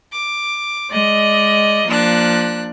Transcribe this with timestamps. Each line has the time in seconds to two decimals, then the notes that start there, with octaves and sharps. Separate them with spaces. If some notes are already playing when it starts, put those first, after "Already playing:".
0.11 D6
0.90 G#3 D5 D#5
1.87 F3 A#3 D4 F#6